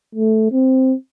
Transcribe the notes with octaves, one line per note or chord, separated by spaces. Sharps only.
A3
C4